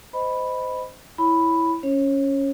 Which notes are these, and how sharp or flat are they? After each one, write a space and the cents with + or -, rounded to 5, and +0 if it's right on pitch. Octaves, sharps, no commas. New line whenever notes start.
C5 -25 D#5 +0 B5 +0
E4 +0 C#5 +0 B5 +0
C#4 +0 C#5 -30